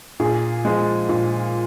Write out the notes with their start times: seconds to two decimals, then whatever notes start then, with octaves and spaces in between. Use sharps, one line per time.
0.20 A#2 G#4
0.65 F3 G#3
1.09 A#2